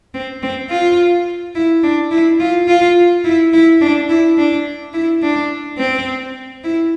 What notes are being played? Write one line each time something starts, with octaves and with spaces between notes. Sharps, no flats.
C4
C4
F4
E4
D4
E4
F4
F4
E4
E4
D4
E4
D4
E4
D4
C4
E4